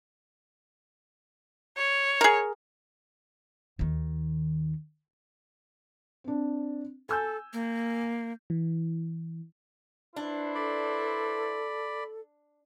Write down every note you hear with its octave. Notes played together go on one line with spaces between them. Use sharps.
C#5
G#4 A#4
D#2 D#3
C4 D4
A4 G#5 E6 G6
A#3
E3
D4 E4 B4 C5
A4 D5 B5